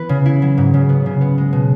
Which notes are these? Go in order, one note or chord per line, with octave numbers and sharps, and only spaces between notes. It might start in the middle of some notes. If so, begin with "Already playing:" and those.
Already playing: E3 B3 E4 B4
C#3
E4
F#3
G#2
C#3
B3
C#3
B3
G#3
B2